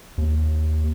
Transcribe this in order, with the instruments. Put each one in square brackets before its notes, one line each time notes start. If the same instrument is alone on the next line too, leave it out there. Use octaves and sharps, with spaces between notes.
[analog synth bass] D#2